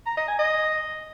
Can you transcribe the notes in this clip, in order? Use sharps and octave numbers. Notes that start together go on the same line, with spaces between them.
A#5
D#5
G#5
D#5